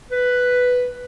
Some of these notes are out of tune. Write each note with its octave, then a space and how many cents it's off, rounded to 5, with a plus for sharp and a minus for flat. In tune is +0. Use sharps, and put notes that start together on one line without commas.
B4 +5